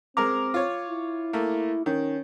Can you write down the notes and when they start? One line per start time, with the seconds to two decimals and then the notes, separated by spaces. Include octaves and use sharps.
0.17 G#3 C4 A#4 A#5 D6
0.54 F4 C#5
0.89 E4
1.33 A3 A#3
1.86 D#3 C#4